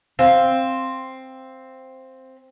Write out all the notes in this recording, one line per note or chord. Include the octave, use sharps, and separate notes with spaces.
C4 F5